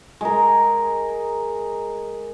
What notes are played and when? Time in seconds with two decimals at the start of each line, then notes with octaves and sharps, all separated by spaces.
0.21 G#3 A#4